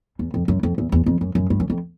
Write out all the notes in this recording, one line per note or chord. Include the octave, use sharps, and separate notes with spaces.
E2
F2
F#2
F2
E2
E2
F2
F#2
F#2
G2
F#2
F2